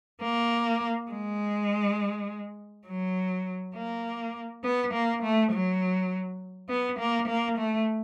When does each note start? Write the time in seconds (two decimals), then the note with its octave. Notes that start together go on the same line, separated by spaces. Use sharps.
0.23 A#3
1.11 G#3
2.87 F#3
3.76 A#3
4.64 B3
4.93 A#3
5.23 A3
5.52 F#3
6.69 B3
6.99 A#3
7.28 A#3
7.57 A3